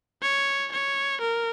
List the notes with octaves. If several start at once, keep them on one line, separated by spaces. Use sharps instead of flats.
C#5
C#5
A#4